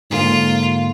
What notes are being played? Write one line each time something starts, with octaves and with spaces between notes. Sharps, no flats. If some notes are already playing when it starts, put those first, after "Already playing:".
G#2 D3 A#3 F4